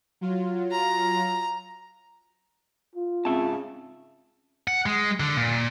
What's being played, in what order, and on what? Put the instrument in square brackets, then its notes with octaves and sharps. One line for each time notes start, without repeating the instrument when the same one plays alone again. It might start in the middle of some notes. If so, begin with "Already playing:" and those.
[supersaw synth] F#3 F4
[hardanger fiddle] A#5
[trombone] F4
[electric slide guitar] G#2 E5 A5 [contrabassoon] C#3 [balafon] C4
[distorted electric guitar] F#5
G#3
D3
A#2